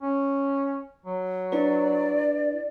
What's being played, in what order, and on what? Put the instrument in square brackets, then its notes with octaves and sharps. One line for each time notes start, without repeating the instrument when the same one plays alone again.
[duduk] C#4
F#3
[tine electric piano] D4 E4 B4 [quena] D5